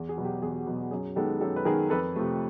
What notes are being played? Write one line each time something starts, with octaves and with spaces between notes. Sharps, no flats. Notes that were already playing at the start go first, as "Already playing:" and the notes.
Already playing: E2
G#4
B2 F#3 B3
G4
E2 G#4
B2 F#3 B3
F#2 G#4
D#3 G#3 B3 G4 A4
F#2 G4 A4
B4
D#3 G#3 B3 G#4 A#4
F2 A4 B4
C3 F3 A3